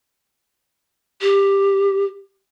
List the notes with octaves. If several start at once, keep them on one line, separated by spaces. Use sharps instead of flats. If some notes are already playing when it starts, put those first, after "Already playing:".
G4